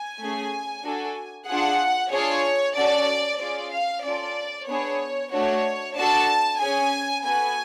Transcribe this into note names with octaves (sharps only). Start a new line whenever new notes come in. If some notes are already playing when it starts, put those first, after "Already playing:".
Already playing: G#5
A3 C#4 G#4
D4 F#4 A4
D4 F4 G#4 F#5
D4 F4 G#4 C#5
C#4 F#4 A4 D5
C#4 F4 G#4 D5
F5
C#4 F4 A4 D5
B3 D4 G#4 C#5
A3 D4 F#4 C#5
D4 F#4 A4 A5
C#4 G#4 G#5
B3 F#4 A4 G#5